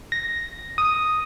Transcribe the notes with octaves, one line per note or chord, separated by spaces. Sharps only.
A#6
D#6